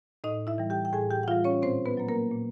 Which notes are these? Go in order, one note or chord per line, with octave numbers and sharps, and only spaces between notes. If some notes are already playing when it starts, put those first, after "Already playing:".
A2 D#4 D#5
E4 E5
E3 G3
G4 G5
G5
A2 G#4 G#5
G4 G5
F#5
E3 G3 F4 F5
C#4 C#5
A#2 C4 C5
B3 B4
F#3 A#3
A#3 A#4
A#2